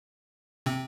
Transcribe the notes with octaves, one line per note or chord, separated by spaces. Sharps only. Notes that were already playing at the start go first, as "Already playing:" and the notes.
C3 C4